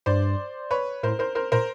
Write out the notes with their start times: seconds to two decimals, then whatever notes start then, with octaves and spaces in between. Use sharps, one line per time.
0.06 G2 C5 D5
0.71 B4 C#5
1.03 A2 A#4 C5
1.19 A#4 C5
1.35 A#4 C5
1.52 A#2 A#4 C5